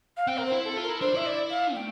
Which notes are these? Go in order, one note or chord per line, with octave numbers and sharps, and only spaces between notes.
F5
C4 G5
A#4
C5
E4
A4
F4
A#4
E4
D4 C5
E4 E5
D5
F5
A3 G5